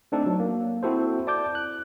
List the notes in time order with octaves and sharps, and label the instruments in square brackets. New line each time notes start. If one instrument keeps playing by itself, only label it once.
[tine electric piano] A3 C4 D4 D#4 A4
F#3
A#3
C4 E4 F#4 A4 C5
D5 A5 D6 G6
F#6